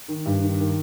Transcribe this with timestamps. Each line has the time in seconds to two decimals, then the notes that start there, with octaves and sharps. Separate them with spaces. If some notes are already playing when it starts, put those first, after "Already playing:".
0.08 D#3
0.26 G2
0.42 D#3
0.60 D#3